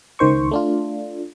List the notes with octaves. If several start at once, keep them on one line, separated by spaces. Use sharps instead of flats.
C#2 D#3 C5 C#6
A3 D4 F4